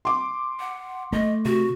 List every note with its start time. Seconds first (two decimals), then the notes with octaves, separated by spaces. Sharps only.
0.05 C6 D6
0.60 F#5
1.13 A3 D#5
1.45 C3 F#4